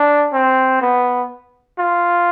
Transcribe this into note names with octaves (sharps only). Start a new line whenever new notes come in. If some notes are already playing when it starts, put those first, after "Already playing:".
Already playing: D4
C4
B3
F4